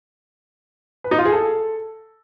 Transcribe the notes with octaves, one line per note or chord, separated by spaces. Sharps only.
B4
D#4
F4
G#4
A4